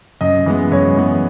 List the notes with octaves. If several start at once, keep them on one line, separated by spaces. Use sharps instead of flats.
F#2 D#5
E3 G#3 B3
F#2 C#5
E3 G#3 B3